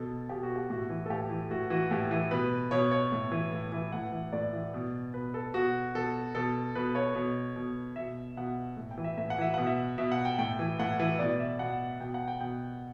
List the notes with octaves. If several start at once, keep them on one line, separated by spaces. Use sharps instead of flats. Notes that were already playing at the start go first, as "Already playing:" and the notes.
Already playing: B2 A4
B2 G4
F#4
G4
A2 F#4
E3
A4
A2 G4
E3
A2 F#4
E3 F#4
A2 G4
E3
B2 B4
B2 C#5
C#5
A2
E3
A2
E3
A2 F#5
E3
A2 D5
E3
B2
B2 B4
A4
B2 F#4
B2 A4
B2 A4
B2 B4
C#5
B2
B2
B2 E5
B2 F#5
A2
G5
E3
E5
A2 E5
F#5
E3 E5
B2 F#5
E5
B2 E5
F#5
G5
A2 G5
E3
A2 F#5
E3
B2 D5
E5
B2 F#5
B2 G5
F#5
G5
B2 G5